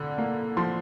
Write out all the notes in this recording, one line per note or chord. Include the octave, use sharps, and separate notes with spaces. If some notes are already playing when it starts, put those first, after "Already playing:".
Already playing: F2 D3
A#3
F3 C6